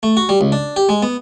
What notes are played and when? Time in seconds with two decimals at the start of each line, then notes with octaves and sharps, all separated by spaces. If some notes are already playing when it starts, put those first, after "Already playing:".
0.03 A3
0.17 F#4
0.29 G3
0.41 C#2
0.52 D4
0.76 G4
0.89 G#3
1.03 B3